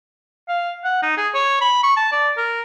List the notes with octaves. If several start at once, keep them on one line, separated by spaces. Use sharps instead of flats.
F5
F#5
D#4
G#4
C#5
B5
C#6
A5
D5
A#4